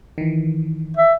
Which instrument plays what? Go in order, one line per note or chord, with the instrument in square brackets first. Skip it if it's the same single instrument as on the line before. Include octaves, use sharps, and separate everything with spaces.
[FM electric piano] D#3 E3
[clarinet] E5